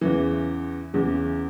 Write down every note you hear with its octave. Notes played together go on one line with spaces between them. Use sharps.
E2 C#3 E3
E2 C#3 E3